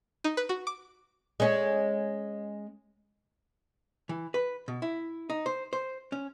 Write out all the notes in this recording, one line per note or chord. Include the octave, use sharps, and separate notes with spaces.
D#4
B4
F#4
D6
G#3 C#4
E3
B4
B2
E4
D#4
C5
C5
C#4